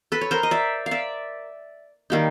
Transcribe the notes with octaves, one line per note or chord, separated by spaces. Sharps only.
A4 B4
C#5
A#4 C5
D#5
D5 E5
F5
D5 E5
D#3 G3 A#3 D#4